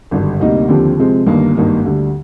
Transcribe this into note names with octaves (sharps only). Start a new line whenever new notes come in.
G#1 G2 D3
D2 C3 G3 A#3 D#4
D#2 D3 F3 C4 G4
C3 F3 G#3 C4
G1 G2 D#3 A#3
G#1 G2 D#3 A#3
D2 D3 G3